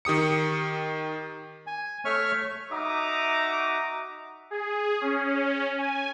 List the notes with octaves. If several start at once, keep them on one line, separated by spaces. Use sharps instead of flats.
D#3 G4 D#6 C#7
G#5
A3 C#5 E5 C#6 F6
D#4 F#4 E5 A#5 D6 D#6
G#4
C#4
G#5